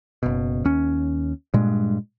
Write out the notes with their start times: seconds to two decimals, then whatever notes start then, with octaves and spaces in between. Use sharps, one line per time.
0.23 F#1 B2
0.65 D#2 C#4
1.54 G2 A#2 G#3